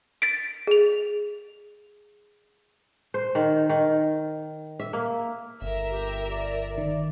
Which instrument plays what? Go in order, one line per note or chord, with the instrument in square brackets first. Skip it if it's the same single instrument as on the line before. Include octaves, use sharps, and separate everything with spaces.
[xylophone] A6 B6 D7
G#4 F7
[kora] C5
D#3
D#3
E5
A#3
[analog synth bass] G1 [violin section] A#4 E5
[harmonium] G4
D5
[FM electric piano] D#3